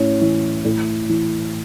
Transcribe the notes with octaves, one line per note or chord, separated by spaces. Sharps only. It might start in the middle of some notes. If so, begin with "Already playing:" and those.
Already playing: A2 C#4
E3
A2
E3